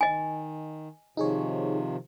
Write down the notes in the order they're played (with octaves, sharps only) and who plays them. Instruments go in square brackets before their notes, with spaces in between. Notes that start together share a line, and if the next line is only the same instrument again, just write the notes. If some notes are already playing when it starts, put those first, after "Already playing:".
[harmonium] D#3 [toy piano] D#5 G#5
[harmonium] C3 D#3 F3 [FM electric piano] D#4 G#4 C#5